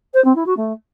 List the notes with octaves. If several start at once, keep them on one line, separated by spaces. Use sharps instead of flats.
C5
C4
E4
F#4
A3